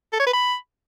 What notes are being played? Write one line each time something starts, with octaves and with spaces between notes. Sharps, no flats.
A4
C#5
B4
B5